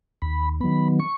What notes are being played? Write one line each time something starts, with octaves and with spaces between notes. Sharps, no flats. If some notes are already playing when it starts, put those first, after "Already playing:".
D#2 B5
D#3 F#3 B3 B5
C#6